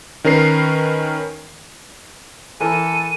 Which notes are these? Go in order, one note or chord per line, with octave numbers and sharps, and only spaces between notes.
D#3 C#4 A#4 B4 C7
E3 A4 A#4 D#7